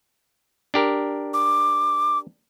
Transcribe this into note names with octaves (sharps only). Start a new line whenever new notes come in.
D4 G4 A#4
D6